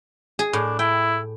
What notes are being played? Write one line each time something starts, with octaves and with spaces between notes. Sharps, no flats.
G#4
A2 D4
E4 G5